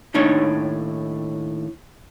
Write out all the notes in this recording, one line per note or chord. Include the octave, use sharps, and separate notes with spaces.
D#2 A2 D4 D#4 C#5